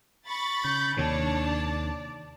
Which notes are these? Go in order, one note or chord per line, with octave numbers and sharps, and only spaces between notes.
B5 C#6 A6
C#3 G6
D#2 C3 D#3 D4 C#5 A5
D5